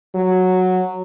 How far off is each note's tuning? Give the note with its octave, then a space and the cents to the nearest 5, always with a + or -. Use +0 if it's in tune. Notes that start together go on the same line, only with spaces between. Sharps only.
F#3 -5